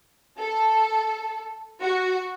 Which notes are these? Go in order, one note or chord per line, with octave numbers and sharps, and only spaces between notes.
A4
F#4